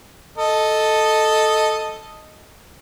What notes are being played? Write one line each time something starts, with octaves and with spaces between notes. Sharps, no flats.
A4 D#5